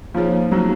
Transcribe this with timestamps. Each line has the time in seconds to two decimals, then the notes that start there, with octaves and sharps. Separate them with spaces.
0.14 F3 A#3 D#4 G#4 C#5
0.51 F#3 A#3 D#4 G#4 C#5